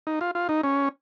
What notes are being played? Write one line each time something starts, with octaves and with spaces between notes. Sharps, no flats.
D#4
F4
F4
D#4
C#4